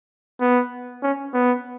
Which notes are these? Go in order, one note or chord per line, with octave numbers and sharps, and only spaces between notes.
B3
C#4
B3